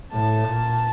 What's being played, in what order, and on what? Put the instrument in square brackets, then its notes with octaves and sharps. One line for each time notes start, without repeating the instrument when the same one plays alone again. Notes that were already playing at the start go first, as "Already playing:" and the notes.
[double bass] A2 [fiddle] A5
[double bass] A#2